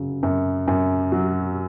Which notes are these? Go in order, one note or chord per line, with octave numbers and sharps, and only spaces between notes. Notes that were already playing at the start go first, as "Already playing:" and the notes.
Already playing: F#2 C#3 F#3
F#2
F#2
F#3